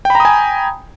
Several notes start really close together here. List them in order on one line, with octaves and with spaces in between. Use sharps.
G5 B5 A#5 D#6 G#5